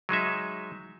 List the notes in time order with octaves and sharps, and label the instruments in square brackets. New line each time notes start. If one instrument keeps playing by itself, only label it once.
[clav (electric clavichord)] F#3 G#3 D#4 E5